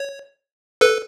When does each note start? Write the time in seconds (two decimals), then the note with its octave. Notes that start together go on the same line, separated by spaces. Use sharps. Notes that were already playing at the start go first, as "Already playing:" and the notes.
Already playing: C#5
0.81 A4 B4